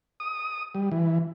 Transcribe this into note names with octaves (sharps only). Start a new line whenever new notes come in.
D#6
G3
E3